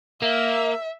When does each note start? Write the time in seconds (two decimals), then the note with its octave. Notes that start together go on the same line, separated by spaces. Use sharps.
0.22 A#3 E5